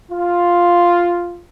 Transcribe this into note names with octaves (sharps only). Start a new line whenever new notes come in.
F4